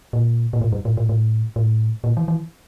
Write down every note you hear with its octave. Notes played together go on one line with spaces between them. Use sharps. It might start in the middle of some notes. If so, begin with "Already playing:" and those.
A#2
A#2
A2
G2
A2
A2
A2
A2
A#2
E3
E3